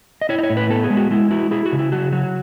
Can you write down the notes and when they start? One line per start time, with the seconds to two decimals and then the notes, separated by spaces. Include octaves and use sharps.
0.21 D#5
0.29 E4 C#5
0.39 D#5
0.43 C#5
0.50 A2
0.57 B4
0.70 B3 A4
0.84 G#4
0.90 G#3
0.97 F#4
1.11 G#3 E4
1.31 E4 F#4
1.51 E4 G#4
1.66 F#4
1.72 C#3
1.79 E4
1.92 F#3 F#4
2.13 F#3 F#4